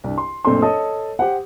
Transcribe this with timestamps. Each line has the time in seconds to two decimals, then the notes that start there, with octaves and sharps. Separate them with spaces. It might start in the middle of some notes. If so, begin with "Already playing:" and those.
0.04 C2 G2
0.18 C6
0.45 F#1 A#2 A3 C4 D4 C6
0.62 A4 C#5 D#5 A5 D#6
1.19 G4 C5 F#5